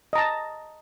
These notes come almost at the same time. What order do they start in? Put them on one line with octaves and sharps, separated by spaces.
D#5 A#5 A5